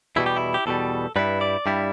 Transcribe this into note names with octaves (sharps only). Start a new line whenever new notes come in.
E2 B2 G3 E4
G4
E4
G4
E2 B2 G3 A4
G2 G3 E4 B4
D5
G2 G3 E4